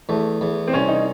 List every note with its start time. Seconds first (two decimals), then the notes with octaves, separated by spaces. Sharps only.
0.09 E2 A3
0.41 E2
0.68 C4
0.73 C2 C#4
0.88 D#4